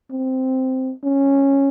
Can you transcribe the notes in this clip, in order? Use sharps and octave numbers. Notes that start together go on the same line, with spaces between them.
C4
C#4